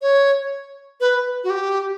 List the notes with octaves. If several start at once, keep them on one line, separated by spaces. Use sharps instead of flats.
C#5
B4
F#4
G4